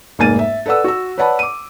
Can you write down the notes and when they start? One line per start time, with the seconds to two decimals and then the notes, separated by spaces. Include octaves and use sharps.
0.19 F1 G#2 A#3 G#5 A6 D#7
0.39 E5
0.66 A4 B4 D5 F#5 E6
0.84 F#4 E6
1.18 B4 C#5 D5 F#5 A5 B5
1.39 D6 D#7